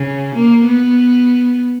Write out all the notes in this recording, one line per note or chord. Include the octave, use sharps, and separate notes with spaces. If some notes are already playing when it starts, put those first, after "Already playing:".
Already playing: C#3
A#3
B3